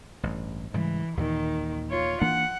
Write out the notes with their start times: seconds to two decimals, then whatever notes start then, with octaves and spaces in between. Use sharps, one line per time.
0.23 A1 G2
0.74 G#2 C#3 E3 G3
1.17 D#2 A#2 D#3 E3
1.90 F4 C#5
2.22 E3 A#3 D4 F#5